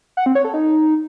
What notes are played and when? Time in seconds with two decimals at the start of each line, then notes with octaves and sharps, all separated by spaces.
0.17 F#5
0.26 C4
0.35 C#5
0.44 A4
0.54 D#4